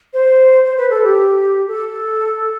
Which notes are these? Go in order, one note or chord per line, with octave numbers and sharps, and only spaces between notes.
C5
C5
B4
A4
G4
A4